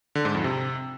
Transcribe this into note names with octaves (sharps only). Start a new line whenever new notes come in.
D3
G#2
F2
C3